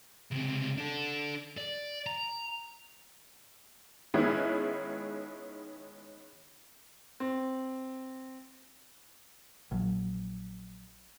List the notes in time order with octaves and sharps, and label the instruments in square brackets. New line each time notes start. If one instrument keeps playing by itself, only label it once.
[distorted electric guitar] C#2 C3
D4 A4
D5
A#5
[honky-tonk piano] D#3 G#3 B3 C#4 D#4 E4
[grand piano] C4
[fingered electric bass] A#1 F#3